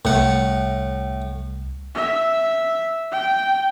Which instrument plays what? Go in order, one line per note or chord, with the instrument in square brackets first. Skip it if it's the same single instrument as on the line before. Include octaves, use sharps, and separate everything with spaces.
[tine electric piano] C2 [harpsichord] A2 F#5
[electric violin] E5
G5